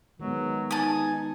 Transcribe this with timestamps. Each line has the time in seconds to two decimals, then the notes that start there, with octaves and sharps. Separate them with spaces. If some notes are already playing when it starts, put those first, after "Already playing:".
0.20 D#3 F#3 G#3 B3
0.71 D#4 G#5 A5 D#6